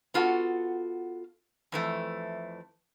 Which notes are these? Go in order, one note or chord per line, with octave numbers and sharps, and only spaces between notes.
B3 F4 F#4 A4
F2 E3 A3